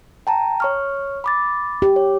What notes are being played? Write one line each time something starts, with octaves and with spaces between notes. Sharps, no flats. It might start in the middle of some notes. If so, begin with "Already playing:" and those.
G5 A5 A#5
C#5 C#6 F6
B5 D6 A6
G4
C#5